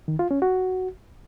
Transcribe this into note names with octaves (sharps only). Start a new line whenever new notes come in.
D#3
F4
C#4
F#4